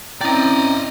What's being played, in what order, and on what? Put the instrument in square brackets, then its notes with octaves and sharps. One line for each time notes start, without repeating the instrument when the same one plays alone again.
[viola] C4 E4 [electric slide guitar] C#4 G5 [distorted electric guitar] D5 D#5 [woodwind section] A#5